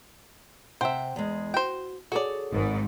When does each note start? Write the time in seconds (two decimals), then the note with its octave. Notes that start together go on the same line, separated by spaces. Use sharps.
0.81 C3 C5 E5 F#5 G5
1.16 E2 G#3
1.54 F#4 C5 G5
2.12 F#4 G#4 A4 C#5 D5
2.53 G#1 G#2